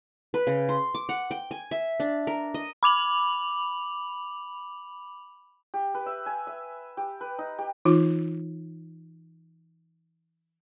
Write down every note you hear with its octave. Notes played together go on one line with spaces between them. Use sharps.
B4
C#3
C6
D6
F#5
G5
G#5
E5
D4
A#4
D#5
B5 D6 F7 F#7
G4
B4
E5
G#5
E5
G4
B4
D#4
G4
E3 D#4 F4